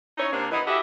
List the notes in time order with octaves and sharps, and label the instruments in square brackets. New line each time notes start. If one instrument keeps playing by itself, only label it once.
[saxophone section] C#4 D#4 E4 C#5
C3 A#3 C4 D4
E3 B3 D#5
E4 F#4 G4 A4 D#5 E5